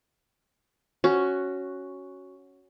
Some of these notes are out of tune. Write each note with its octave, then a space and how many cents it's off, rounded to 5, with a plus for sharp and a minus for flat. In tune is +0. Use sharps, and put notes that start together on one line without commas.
C#4 +0 F#4 +5